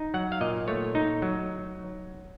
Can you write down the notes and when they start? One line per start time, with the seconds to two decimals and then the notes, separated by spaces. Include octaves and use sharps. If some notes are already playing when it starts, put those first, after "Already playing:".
Already playing: D#4
0.14 F#3 F#5
0.32 F5
0.41 A#2 D#5
0.68 A3 C#5
0.95 D#4
1.22 F#3